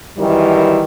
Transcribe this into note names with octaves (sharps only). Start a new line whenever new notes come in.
F#2 D#3 E3 G3